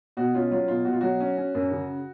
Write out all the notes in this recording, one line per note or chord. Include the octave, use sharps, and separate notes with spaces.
B2 F#4
C#4 F4
F#3 F4
B2 F4
B2 F#4
F4
F#3 F#4
C#4
C#4
F#2
C#3